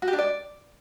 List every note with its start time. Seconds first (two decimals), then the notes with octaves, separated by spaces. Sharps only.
0.02 F#4
0.08 G4
0.13 D4
0.19 D5